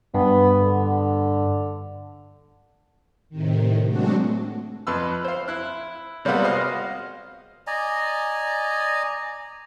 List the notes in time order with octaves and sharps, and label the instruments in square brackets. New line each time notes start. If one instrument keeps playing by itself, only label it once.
[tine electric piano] G2 [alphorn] B3
[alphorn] D3
[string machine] A2 C3 D#3
F#3 G#3 A3 C4 D4 F#4
[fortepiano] F2 B4 C6 E6
C5 F5
E4 F#6
C3 G3 G#3 A#3 B3 F4
F4 F#4 C5 D#5 F5 C6
[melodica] D5 D#5 G#5 A#5